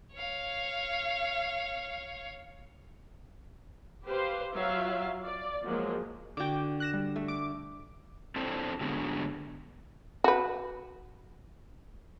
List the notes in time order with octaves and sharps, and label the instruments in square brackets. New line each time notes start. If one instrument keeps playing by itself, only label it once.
[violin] C#5 F5
[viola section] G4 B4 C5 F5
F#3 F4 E5 F5
D5
F3 F#3 G#3 A#3
[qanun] D3 F#4 [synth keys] G5 D6
[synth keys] F#6 A#6 E7
G3
[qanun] A3
[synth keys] D6
[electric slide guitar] C4 D4 E4 A4 C5
D3 F#3 G#3 A3 B3 D4
[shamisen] F#4 B4